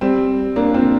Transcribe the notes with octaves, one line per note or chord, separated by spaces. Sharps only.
G3 C4
A#3 D4
C4 F4